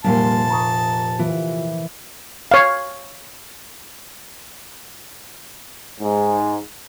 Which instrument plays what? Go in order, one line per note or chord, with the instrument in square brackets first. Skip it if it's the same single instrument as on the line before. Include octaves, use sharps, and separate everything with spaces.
[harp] F1 A#2 C6 [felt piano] G3 A#3 [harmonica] A5
[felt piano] A#5 C#6 D#6
[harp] E3 [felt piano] F3
[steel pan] C#5 F5
[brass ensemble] G#2